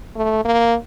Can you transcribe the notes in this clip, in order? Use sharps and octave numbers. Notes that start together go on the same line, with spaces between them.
A3
A#3